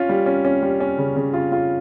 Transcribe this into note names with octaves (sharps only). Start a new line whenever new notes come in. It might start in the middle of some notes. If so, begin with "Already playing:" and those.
Already playing: C#4 F4
G3
C#4
C#4
G3
C#4
C#3
C#3
F4
F4